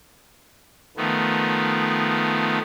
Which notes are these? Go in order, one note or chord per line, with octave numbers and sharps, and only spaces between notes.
D#3 F3 A3 B3